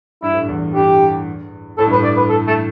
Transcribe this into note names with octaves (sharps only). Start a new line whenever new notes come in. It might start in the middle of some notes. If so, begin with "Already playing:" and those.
G2 E4
A2
G2
E2
G2 G4
A2 A4
G2
A2 B4
D5
B4
A4
A3